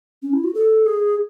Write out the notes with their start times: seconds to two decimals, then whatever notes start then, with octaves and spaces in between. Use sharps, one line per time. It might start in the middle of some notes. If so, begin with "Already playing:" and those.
0.22 C#4
0.33 E4
0.44 F#4
0.55 A4
0.86 G#4